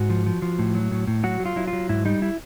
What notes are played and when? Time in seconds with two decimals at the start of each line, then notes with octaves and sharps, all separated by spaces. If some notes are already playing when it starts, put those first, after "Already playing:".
Already playing: G#2 F#4
0.10 F3
0.26 F3
0.42 F3
0.59 A2
0.75 F#3
0.92 A2
1.07 A2
1.24 F#3 F#4
1.40 F#3
1.46 F4
1.56 F#3 E4
1.67 F4
1.73 F#3
1.89 G#2 E4
2.05 G3 D#4
2.22 E4